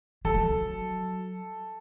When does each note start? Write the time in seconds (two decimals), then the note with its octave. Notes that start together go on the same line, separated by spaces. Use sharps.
0.25 F#3 A4
0.34 A3
0.43 F#3